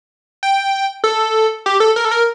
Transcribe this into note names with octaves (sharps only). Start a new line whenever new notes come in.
G5
A4
G4
A4
A#4
A4
A#4